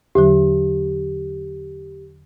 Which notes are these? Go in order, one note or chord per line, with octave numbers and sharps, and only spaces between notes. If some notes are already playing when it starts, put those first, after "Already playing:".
E2 D3 F#3 G4